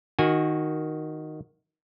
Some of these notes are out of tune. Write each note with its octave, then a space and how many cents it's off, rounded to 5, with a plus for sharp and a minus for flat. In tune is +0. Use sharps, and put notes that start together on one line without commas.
D#3 +0 F#4 +0 G#5 -25